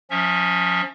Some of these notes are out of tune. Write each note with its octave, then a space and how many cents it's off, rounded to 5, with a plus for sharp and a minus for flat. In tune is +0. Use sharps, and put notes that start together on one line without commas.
F3 +35 C#4 +0 E5 +0